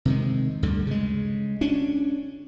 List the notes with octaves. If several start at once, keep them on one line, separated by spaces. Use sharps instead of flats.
C3 D#3 G#3
D2 G2 D3
C#3 G#3
C#4 D4